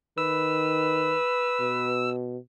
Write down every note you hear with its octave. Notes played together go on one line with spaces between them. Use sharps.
D#3 B4 E6
B2